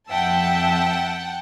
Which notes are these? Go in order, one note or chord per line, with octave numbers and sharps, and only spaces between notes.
F2 E5 F#5 G5 A5